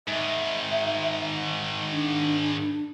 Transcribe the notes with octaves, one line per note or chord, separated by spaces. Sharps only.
G#2 D#3 E5
D4